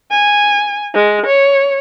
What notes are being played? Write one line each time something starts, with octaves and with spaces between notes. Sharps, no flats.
G#5
G#3
C#5